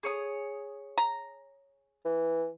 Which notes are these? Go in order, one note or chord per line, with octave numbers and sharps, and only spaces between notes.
G#4 C#5 D#6
A#5
E3